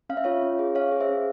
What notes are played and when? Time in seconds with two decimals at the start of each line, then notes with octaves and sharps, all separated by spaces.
0.09 C#4 F5
0.17 E5
0.24 F4 C#5 F5
0.42 C#4
0.59 G#4
0.75 C#4 C#5 F5
0.92 G#4
1.00 C5 E5
1.09 C#4